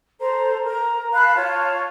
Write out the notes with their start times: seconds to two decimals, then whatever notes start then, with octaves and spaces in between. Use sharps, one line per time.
0.20 A4 C5 A#5
0.64 A#4 A#5
1.11 F5 A5 B5 F#6
1.34 F4 C#5 A5